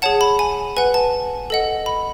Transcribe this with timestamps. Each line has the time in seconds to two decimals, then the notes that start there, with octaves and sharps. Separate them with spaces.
0.02 G#4 C#5 F#5 A5
0.21 B5
0.39 G#5
0.77 B4 F#5 G#5
0.94 A5
1.50 A4 D#5 F#5
1.86 B5